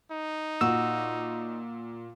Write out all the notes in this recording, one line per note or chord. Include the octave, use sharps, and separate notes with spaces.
D#4
A#2 F#4 E6